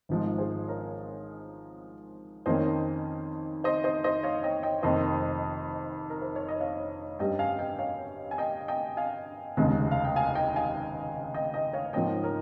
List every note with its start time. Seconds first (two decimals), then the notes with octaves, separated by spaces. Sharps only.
0.09 G#1 G#2 F3 G#3
0.38 G#4 C5
0.68 A#4 C#5
2.46 F2 D#3 A#3 C#4 C5 D#5
3.64 C5 D#5
3.84 C5 D#5
4.04 C5 D#5
4.23 C#5 F5
4.43 D#5 G5
4.63 D#5 G5
4.83 F1 F2 D#3 A#3 C5 D#5
6.10 A#4
6.22 C5
6.36 C#5
6.48 D#5
6.60 C#5 F5
7.19 G2 G3 C#4 D#5 G5
7.39 F5 G#5
7.59 D#5 G5
7.79 C#5 F5
8.31 G#5
8.38 D#5 G5
8.68 D#5 G5
8.97 F5 G#5
9.57 F1 D#2 C#3 G#3
9.91 F5
10.04 G5
10.16 F5 G#5
10.35 D#5 G5
10.56 F5 G#5
11.34 D#5 G5
11.54 D#5 G5
11.73 C#5 F5
11.93 G#2 F3 A#3 C#4 D#5 G5
12.24 A#4 C#5